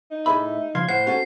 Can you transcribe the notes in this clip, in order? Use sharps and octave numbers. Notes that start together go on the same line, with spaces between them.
D#4
A2 G#4 E5 B5
C#3 F3 F5 C6 G#6
A2 C5 F#5 C7
C#4 F#4 A4